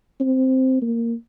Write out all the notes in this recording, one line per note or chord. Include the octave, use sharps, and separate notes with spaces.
C4
A#3